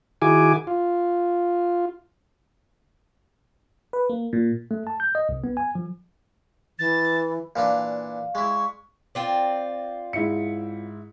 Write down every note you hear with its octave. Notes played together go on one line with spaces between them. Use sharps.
D#3 E4 F#4 G#4 G#5 D6
F4
B4
A#3
A#2
A3
A5
G6
D#5
C2
B3
G#5
F3
E3 A6
A#2 E3 D4 D5 F5
G#3 E4 C#6
C4 F4 D5
G#2 E4 C#7